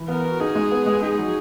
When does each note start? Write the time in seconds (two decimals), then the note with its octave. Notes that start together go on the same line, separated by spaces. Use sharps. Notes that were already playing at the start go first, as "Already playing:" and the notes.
Already playing: E3
0.08 B3 A#4
0.25 F#4
0.40 D#4 G#4
0.55 G#3
0.71 B3
0.86 G#3
1.02 D#4 G#4
1.18 F#3